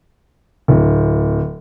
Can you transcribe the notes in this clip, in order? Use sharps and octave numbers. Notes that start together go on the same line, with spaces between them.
D1